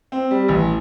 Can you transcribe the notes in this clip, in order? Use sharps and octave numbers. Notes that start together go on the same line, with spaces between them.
C4
G3
A1